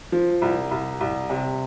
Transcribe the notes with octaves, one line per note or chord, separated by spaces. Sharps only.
F3
C2
C2
C2
C3